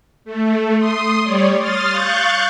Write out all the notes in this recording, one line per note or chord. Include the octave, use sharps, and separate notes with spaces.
A3
C6 D#6
G3 C#5 D5
C6 D#6 F6 A6
F5 C#6 F#6 G6 A6